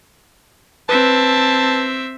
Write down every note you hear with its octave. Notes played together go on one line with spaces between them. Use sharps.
C4 B4 E5 A5